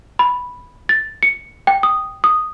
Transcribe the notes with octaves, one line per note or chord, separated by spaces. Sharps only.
B5
A6
C#7
G5
D#6
D#6